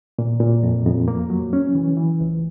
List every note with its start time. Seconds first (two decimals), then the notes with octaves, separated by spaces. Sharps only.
0.19 A#2
0.40 A#2
0.63 F2
0.86 F2
1.08 A#3
1.30 F#3
1.53 C#4
1.75 E3
1.97 E3
2.20 C#2